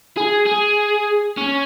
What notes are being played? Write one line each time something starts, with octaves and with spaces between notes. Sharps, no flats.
G#4
G#4
C#4